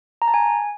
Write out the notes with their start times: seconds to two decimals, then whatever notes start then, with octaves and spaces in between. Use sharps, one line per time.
0.22 A#5
0.28 A5
0.34 G#5